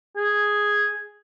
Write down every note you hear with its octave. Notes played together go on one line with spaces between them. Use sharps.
G#4